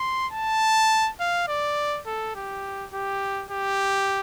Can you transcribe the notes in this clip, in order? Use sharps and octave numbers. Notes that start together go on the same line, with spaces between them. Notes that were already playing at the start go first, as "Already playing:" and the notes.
Already playing: C6
A5
F5
D5
A4
G4
G4
G4